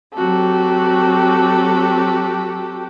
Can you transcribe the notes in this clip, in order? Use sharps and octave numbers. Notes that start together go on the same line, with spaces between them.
F#3 C4 F#4 G4 A4